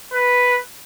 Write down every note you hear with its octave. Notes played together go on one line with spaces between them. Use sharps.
B4